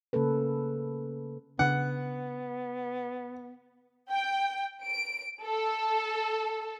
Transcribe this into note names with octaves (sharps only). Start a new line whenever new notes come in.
C#3 A#3 C#4 A4 B4
C#3 B3 D4 F#5
G5
D7
A4